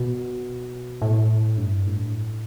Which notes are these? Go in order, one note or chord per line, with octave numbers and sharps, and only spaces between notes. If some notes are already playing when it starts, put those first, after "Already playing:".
Already playing: B2
A2
G2
A2